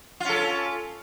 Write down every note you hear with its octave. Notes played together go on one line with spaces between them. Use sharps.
C#4 F4 A4